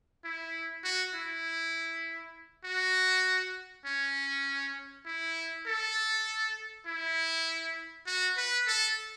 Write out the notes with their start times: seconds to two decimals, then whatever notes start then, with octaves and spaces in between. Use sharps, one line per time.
0.24 E4
0.84 F#4
1.15 E4
2.65 F#4
3.85 C#4
5.06 E4
5.67 A4
6.87 E4
8.07 F#4
8.37 B4
8.67 A4